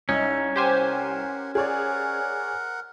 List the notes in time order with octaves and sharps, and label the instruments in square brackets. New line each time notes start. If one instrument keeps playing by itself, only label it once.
[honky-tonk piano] C2 [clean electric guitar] C#4 [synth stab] D#4 [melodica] E5
[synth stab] G4 C5 G#5 [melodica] A#4 F#5
[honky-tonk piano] G#4 C#5 D5 [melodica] A#4 F#5